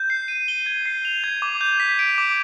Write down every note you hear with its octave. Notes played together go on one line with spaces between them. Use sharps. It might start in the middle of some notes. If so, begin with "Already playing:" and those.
Already playing: G6
C7
D#7
G7
G#6
C7
F7
G#6
D6
G6
B6
D7
D6